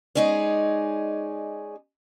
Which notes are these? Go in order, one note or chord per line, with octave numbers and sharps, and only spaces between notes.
G#3 C#4 D#4 G#4 D5